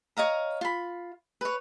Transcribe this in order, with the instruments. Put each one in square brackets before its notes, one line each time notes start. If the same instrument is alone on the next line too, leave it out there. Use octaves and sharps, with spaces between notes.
[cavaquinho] C#5 D#5 F5 A#5
F4 B5
B4 C#5